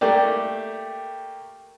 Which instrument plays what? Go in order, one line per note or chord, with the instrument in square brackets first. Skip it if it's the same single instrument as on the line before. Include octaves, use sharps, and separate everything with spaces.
[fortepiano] A3 A#3 G4 D5